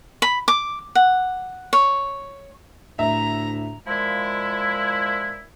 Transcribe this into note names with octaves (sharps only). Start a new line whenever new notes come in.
B5
D6
F#5
C#5
D2 A2 E5 A#5
A#2 F3 G#3 E4